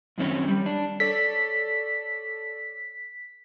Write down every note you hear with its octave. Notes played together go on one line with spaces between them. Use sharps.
F#2 D#3 C4 C#4 C#5
G3
D4
A4 C#5 D5 B6